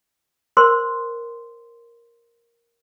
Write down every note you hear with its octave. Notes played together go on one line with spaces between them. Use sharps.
A#4 C5 C6